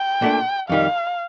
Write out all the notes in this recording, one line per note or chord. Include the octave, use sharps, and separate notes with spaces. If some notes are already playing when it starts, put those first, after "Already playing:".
Already playing: G5
A#2 A3 D4
F2 D#3 G3 F5